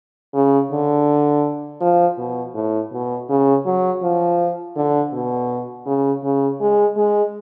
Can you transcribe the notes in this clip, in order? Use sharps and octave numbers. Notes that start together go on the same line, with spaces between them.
C#3
D3
F3
B2
A2
B2
C#3
F#3
F3
D3
B2
C#3
C#3
G#3
G#3